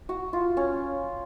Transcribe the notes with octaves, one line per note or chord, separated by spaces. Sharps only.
F#4
F4
C#4